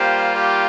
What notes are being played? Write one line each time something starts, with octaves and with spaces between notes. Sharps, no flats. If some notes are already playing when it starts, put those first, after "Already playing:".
Already playing: G3 A#3 F4 G4 C5
G4